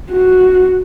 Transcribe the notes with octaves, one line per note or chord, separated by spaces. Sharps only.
F#4